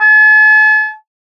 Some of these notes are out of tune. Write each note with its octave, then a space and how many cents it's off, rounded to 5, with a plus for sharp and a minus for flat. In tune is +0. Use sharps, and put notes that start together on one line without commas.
A5 -45